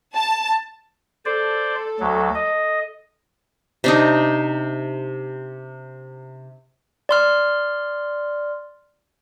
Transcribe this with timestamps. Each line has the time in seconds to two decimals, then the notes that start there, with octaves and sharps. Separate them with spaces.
0.14 A5
1.25 A4 C5 D5
2.00 D2 F#3
2.35 D#5
3.84 C3 D4 D#4
7.09 D5 C6 F6